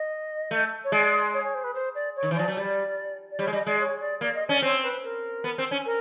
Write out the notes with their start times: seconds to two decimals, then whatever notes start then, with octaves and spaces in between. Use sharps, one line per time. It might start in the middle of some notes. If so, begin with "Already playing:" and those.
Already playing: D#5
0.51 A3
0.84 C#5
0.92 G#3 D5
1.33 C#5
1.44 C#5
1.54 C5
1.64 B4
1.74 C5
1.95 D5
2.16 C#5
2.23 D#3
2.31 E3
2.36 F3 D5
2.48 F#3
2.56 G3 D5
3.31 D5
3.39 G3 C#5
3.47 G#3
3.53 G3 D#5
3.66 G#3 D5
3.80 C#5
4.01 D5
4.21 A#3 D5
4.34 D#5
4.49 C#4 D5
4.62 C4 C#5
4.83 B4
5.04 A#4
5.44 B3
5.58 C4
5.71 C#4
5.85 A#4